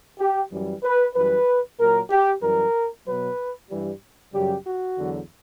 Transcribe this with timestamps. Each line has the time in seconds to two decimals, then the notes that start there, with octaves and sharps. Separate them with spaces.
0.19 G4
0.51 F#2 E3 G3
0.83 B4
1.15 F#2 E3 G3 B4
1.78 A#2 F#3 A#4
2.10 G4
2.42 F#2 E3 G3 A#4
3.06 B2 F#3 B4
3.69 G2 E3 G3
4.33 F#2 C#3 G3 G4
4.65 F#4
4.97 E2 D3 F#3